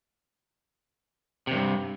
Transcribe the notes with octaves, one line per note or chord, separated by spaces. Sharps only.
E2 G2 C3